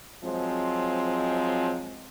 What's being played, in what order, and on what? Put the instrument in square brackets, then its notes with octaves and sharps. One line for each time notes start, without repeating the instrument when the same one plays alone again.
[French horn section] F3 F#3 G#3 C4